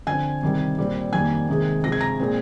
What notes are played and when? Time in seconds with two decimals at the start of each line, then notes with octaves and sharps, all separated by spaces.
0.07 D3 F3 C4 G#5 G#6
0.42 C3 D#3 G3 C4
0.78 A#2 G3 C4
1.13 F2 D#3 G3 A#3 G#5 G#6
1.48 C3 D#3 G#3 C4
1.84 C3 F3 G#3 A#6
1.92 G#6
2.01 A#5 A#6
2.19 A#2 G#3 C4